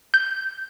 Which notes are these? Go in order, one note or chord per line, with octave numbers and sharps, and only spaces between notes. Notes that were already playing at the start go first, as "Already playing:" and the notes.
G6